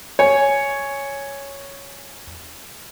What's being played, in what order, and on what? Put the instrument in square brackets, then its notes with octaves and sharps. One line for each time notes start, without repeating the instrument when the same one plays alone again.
[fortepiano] C#5 G#5